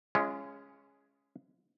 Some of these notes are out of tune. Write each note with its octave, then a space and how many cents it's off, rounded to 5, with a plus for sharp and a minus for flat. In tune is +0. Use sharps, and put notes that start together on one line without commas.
G#3 +0 C#4 +0 F4 -40